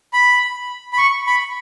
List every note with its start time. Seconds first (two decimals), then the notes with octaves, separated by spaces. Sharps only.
0.13 B5
0.93 B5
0.98 C#6
1.27 B5